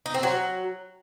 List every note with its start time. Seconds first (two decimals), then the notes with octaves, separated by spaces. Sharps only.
0.06 D#4
0.14 C4
0.23 F#3